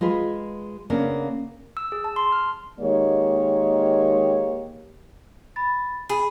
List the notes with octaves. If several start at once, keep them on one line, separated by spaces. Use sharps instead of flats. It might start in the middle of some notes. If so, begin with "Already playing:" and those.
G#3 F4 G#4 B4
C#3 A#3 B3 D4
E6
G#4
A5
C6
F6
D#3 G#3 A#3 G4 C#5
B5 A6
G#4 B5